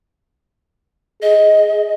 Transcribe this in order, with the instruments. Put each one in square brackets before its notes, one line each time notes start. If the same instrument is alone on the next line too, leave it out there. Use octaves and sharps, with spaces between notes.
[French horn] G#4 [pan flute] D#5